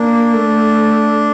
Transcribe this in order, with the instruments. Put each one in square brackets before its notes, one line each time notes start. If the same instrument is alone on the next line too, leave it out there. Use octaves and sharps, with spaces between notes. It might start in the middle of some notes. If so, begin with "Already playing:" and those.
Already playing: [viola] A#3 [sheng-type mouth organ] D4
[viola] A3